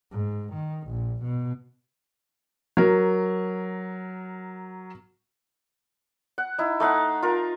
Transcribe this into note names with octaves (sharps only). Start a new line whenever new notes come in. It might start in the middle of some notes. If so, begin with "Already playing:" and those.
G#2
D#3
A#1
B2
F#3 A#4
F#5
D#4 E4
A3 D#4 F5 F#5
F4 A#4